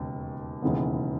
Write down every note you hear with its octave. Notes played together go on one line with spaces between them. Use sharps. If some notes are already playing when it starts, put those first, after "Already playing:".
Already playing: E1 D#2 C#3
E1 D#2 C#3 E3 B3